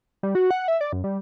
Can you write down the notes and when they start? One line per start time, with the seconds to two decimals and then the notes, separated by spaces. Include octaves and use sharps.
0.23 G3
0.35 F#4
0.51 F#5
0.68 E5
0.81 D5
0.93 F#2
1.04 G3